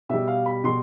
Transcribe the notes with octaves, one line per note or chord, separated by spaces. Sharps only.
B2 G3 E5
F5
B5
B2 G3 C6